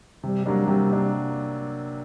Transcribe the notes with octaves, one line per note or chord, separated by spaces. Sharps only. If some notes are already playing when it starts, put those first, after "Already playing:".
C3 G3
F#3 G3 A#3 D4
C3 G3
F#3 A#3 D4